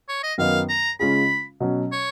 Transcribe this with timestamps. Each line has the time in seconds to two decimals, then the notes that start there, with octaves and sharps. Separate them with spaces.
0.09 C#5
0.23 D#5
0.38 F#2 D#3 F#3 B3 D#4 F5
0.69 A#5
1.00 C#3 G#3 C#4 F4 G#4 B5
1.60 B2 F#3 C#4
1.92 C#5